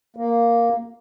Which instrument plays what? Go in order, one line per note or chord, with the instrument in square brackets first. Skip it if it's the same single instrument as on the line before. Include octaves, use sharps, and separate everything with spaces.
[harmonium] A#3